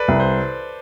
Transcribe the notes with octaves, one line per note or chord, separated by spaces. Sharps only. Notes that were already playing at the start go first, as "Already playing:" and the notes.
Already playing: A4 B4 D5
C2
C5